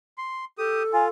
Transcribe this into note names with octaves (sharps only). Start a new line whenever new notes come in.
C6
G4 A4 D#6
F4 G#5